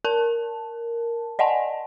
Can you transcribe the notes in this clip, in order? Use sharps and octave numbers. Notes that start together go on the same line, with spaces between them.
A#4 A5
D5 D#5 F#5 G#5 A5